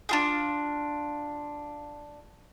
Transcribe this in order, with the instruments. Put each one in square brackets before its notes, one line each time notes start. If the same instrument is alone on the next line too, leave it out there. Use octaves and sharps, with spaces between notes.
[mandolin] D4 F4 G#4